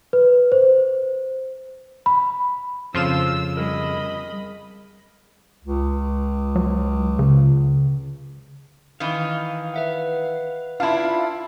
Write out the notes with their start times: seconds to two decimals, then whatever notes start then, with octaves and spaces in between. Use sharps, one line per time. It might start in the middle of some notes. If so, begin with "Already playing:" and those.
0.13 B4
0.52 C5
2.06 B5
2.94 F2 C#3 F3 F4 E6 E7
3.57 G3 G#4 A#4 D#5 B5
5.65 C#2
6.56 F#3
7.19 C#3
9.00 D#3 E3 F5
9.74 B4 E5 F#5
10.80 D4 E4 F4 F5 A5 B5